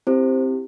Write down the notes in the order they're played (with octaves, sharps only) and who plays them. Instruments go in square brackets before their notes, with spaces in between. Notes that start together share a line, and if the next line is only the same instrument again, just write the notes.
[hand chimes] C4 E4 G4 C5